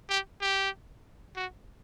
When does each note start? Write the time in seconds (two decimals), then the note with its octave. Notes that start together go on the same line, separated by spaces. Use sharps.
0.09 G4
0.41 G4
1.36 F#4